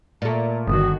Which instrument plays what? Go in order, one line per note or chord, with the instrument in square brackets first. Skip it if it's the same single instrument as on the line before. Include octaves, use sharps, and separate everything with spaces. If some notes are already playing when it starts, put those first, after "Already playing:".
[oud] A#2 A3 [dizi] A#5
[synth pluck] G1 [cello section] D3 D#3 F#4 [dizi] D#6